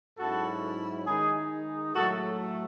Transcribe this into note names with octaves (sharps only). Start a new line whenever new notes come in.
G#2 F#3 C#4 E4 F#4 A4
D#3 G#3 D#4 G#4
A2 F#3 A3 F#4 A4